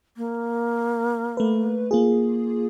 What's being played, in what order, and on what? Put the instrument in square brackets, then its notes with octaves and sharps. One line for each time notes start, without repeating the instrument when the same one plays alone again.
[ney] A#3
[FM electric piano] A3 B4
A#3 F4 G#4